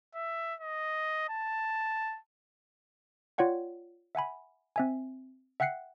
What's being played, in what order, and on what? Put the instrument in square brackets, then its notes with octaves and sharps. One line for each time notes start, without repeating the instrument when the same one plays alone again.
[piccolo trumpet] E5
D#5
A5
[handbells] F4 C#5 D5 F#5 G5
E5 F#5 G#5 B5
C4 E5 G#5
E5 F#5 G5 F#6 C7 C#7